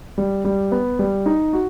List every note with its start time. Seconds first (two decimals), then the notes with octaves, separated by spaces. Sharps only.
0.18 G3
0.45 G3
0.72 B3
0.99 G3
1.26 D#4
1.53 F#4